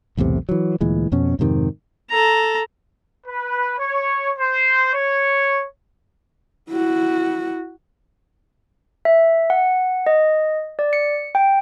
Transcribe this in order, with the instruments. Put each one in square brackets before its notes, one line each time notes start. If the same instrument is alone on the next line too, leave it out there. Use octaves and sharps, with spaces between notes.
[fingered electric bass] B1 E2 A2 C3
E3 F#3
D2 A#2 E3 G#3
F2 B2 C#4
F2 G#2 C3 D#3
[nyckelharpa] A4 A#5
[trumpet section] B4
C#5
C5
C#5
[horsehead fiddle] E4 F#4
[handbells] E5
F#5
D#5
D5
C#7
G5